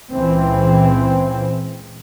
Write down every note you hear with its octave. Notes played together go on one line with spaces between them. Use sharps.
C#2 A#2 E3 C4